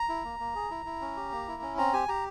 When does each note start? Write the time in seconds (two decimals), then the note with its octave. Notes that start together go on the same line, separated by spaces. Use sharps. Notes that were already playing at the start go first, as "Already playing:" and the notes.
Already playing: A#5
0.09 E4
0.24 A#3
0.40 A#3
0.55 G#4
0.71 E4
0.86 E4
1.01 C#4
1.16 G4
1.32 A#3
1.48 E4
1.62 C#4
1.78 C4 A#5
1.93 G4 G#5
2.08 G4 A#5